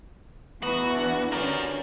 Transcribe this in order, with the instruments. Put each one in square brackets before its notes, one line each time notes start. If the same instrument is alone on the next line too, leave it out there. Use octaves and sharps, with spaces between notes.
[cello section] E2 E3 [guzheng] B3 D#4 B4 [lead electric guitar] F#4
[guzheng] D4 E4 F5
[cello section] D3 C#4 [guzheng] G3 A#5 [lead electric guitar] F#4 A#4